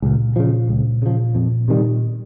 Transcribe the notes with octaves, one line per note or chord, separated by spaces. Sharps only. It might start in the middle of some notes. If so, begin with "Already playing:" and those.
C#2 A#2
C#3 F3
C#2
C#3 F3
F2
C3 D#3 G3